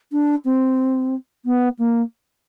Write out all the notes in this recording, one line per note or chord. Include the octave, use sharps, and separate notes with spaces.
D4
C4
B3
A#3